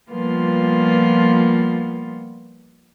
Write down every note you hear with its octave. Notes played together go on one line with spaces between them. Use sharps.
F3 G3 A#3 B3 F4